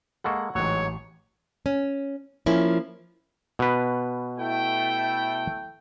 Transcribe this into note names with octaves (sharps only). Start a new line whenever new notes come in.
G#3 A#3 A4 F#5 C#6
A1 G#2 F#3 C#5
C#4
F3 A#3 C#4 E4
B2 B4
A3 E4 G5